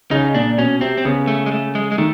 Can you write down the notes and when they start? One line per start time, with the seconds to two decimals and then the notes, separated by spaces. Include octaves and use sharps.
0.11 C#3 D#4
0.34 A#2 D4
0.58 B2 C#4
0.81 C3 C4
0.97 C4
1.05 C#3 B3
1.28 A3
1.46 G#3
1.52 A3
1.75 G#3
1.92 G#3
1.98 D#3 A3